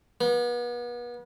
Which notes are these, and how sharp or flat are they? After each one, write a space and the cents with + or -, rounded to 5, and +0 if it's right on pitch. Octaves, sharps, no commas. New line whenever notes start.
B3 -35